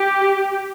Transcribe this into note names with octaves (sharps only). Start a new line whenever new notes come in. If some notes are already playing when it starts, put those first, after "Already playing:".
Already playing: G4